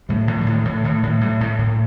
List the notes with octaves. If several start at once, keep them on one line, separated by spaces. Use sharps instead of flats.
A2 G3
A2 F3
D3
A2
D#3
A2 E3
A2 D#3
A2 D#3
A2 G3
A2 A3
A2 A#3